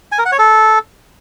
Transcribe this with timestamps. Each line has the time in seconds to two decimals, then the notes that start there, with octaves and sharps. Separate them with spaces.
0.12 G#5
0.19 A#4
0.25 F#5
0.32 C#5
0.39 A4